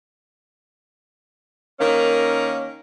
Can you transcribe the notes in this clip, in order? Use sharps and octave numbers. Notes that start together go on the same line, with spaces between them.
D#3 A#3 C#4 A#4